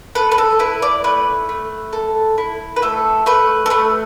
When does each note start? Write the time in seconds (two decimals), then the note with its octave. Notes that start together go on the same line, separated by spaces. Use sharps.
0.15 A4 B4
0.31 B4
0.38 A4
0.59 E4 B4
0.82 D5
1.04 A3 B4
1.49 A3
1.93 A4
2.38 E4
2.76 B4
2.82 A3 A4
3.26 A3 B4
3.66 A4
3.70 A3 B4